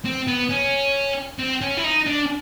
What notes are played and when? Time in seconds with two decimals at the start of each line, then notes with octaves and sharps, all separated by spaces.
0.05 C4
0.27 B3
0.49 C#4
1.39 C4
1.61 C#4
1.77 E4
1.84 D#4
2.06 D4